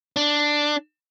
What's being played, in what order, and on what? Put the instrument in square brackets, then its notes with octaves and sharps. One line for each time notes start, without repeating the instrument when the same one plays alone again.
[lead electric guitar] D4